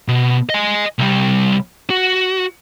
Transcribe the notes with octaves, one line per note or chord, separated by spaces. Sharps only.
B2
D#5 G#5
C2 G3
F#4